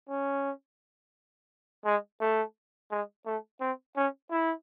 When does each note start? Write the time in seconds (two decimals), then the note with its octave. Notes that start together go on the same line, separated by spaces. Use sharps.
0.09 C#4
1.85 G#3
2.21 A3
2.91 G#3
3.26 A3
3.61 C4
3.96 C#4
4.31 E4